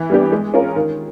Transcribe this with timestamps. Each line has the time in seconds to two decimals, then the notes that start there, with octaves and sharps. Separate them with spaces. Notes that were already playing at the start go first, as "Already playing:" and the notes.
Already playing: E3
0.10 G3 B3 D4 G4
0.32 G#3
0.54 C#4 F4 A#4
0.75 D#3